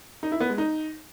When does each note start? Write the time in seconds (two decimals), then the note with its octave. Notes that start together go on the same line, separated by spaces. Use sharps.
0.23 D#4
0.32 E4
0.40 B3
0.49 G#3
0.58 D#4